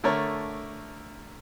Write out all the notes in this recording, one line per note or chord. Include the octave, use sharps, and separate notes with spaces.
D3 A3 A#4 C#5